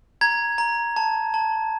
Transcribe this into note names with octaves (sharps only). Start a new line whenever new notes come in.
A#5 G#6
A#5
A5
A5